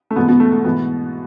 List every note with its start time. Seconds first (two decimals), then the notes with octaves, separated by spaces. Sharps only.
0.11 A3
0.16 G#2 B2 E3 B3
0.28 B2 B3
0.40 A3
0.52 A3
0.64 G#2 B2 E3 B3